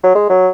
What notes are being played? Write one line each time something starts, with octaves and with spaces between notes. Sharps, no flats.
F#3
G#3
F#3